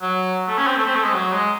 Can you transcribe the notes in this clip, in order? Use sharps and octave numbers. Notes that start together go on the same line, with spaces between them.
F#3
A3
C#4
C4
A3
C4
A3
G#3
F#3
G#3